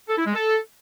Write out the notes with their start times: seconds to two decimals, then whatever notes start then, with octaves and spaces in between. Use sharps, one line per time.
0.09 A4
0.17 E4
0.26 G#3
0.35 A4